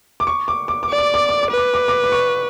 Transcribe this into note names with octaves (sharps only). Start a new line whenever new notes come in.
D6
C#6
D6
D6
D6
D5
D6
D6
D6
D6
B4
D6
D6
D6
D6
C#6